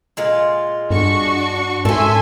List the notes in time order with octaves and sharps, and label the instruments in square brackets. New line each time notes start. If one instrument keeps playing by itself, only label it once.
[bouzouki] A#2 G#3 F4
[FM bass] G2 [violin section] D4 F#4 C#6
[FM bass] G#2 [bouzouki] C#4 A4 [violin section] E5 G#5 C6